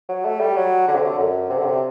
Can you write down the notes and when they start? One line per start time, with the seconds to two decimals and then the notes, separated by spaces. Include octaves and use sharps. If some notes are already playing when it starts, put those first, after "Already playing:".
0.09 F#3
0.25 A3
0.40 G3
0.56 F#3
0.88 D3
0.95 C3
1.03 D3
1.18 F#2
1.50 C3
1.58 D3
1.65 C3